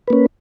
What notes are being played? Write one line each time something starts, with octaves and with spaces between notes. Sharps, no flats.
A#3 C#4 B4